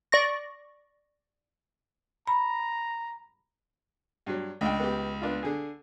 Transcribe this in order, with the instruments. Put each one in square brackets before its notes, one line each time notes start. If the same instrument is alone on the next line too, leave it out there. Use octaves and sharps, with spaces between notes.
[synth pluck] D5 C#6 A#6
[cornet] A#5 [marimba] B5
[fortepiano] G2 F#3
[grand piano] C#2 [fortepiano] D4 G5
[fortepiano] B3 G4
B3 D4 F4
D3 G#4